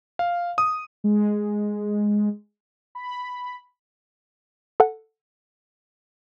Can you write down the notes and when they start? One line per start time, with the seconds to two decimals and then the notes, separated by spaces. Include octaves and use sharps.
0.19 F5
0.58 D#6
1.04 G#3
2.95 B5
4.80 A4 F#5